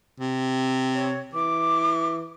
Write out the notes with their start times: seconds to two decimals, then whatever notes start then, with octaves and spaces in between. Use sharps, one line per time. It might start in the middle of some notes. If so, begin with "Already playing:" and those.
0.20 C3
0.95 C#5
1.34 E3 D6